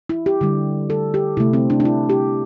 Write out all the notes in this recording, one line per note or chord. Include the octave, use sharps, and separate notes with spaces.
E4
G4
D3 G3
A4
G4
C3 A3 E4
C4
D4
D4
E4
G4